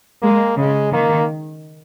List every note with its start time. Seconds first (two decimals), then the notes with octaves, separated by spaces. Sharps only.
0.22 G#3 A#3
0.57 C#3 G#3
0.93 D#3 A#3